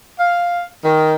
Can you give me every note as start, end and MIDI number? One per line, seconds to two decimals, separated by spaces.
0.20 0.64 77
0.84 1.16 51